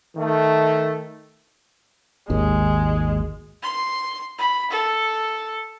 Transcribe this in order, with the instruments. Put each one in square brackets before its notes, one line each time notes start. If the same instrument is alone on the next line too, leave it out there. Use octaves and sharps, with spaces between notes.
[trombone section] D#3 A3
[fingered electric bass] G#1 D#2 [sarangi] G#3
[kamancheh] C6
B5
A4